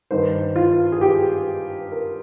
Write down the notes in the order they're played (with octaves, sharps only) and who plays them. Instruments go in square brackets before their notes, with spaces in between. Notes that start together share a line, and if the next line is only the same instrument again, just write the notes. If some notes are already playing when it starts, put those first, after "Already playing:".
[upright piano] G2 D#3 C5
F4
G#4
G4
A#4